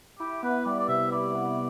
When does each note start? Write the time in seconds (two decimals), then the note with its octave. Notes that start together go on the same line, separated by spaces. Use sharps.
0.19 E4 G4
0.43 B3 B4
0.65 G3 D5
0.79 D5
0.88 C3 E5
1.12 E4 D5
1.35 B3